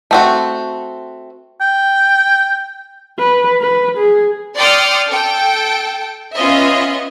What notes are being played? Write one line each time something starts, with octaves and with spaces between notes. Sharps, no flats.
A3 C4 F#4
G5
B4
B4
G#4
D5 G5 C6 D#6 F6 C#7
A4 G5
B3 C#4 F4 D#5 E5